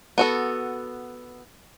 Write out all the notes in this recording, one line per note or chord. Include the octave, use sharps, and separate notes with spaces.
B3 F#4 A4